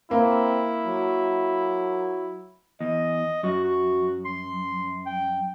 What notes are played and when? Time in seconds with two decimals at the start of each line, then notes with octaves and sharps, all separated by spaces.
0.11 A#3 C4 E4
0.86 F#3
2.81 E2 D#5
3.43 F#2 F#4
3.64 F#4
4.25 C6
5.06 G5